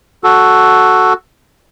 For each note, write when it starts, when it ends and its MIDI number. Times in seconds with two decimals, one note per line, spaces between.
0.24 1.13 66
0.24 1.13 69